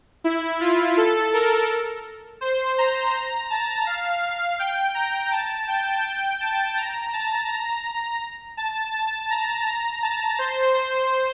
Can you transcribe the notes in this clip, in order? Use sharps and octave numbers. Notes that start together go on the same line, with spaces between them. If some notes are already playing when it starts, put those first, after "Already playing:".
E4
F4
A4
A#4
C5
A#5
A#5
A5
F5
F5
G5
A#5
A5
G5
G5
A5
A#5
A5
A#5
A5
A5
A#5
A#5
A5
C5
C5